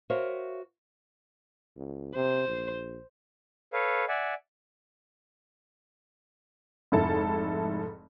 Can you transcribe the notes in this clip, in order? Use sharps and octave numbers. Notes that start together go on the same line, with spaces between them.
F#4 A#4 C5 C#5 E5 F5
C#2
C3 C5
A#1
A4 B4 C#5 F5
D5 E5 F#5 G#5
F1 G#2 E4 A4 A5